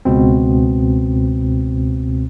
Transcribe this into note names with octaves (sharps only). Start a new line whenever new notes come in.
C#2 B2 C4